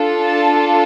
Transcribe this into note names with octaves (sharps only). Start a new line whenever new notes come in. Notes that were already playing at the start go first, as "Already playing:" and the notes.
Already playing: D4 F4 A4
A5